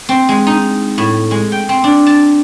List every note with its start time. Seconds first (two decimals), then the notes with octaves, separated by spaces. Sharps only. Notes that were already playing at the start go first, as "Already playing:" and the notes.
0.09 C4
0.29 G#3
0.47 D#4
0.98 A2
1.31 G#3
1.52 G5
1.69 C4
1.84 D4
2.07 A5